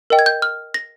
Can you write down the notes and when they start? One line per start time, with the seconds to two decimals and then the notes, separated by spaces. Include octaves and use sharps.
0.10 A#4 D#5 G5
0.19 G#6
0.26 G6
0.42 F6
0.74 A#6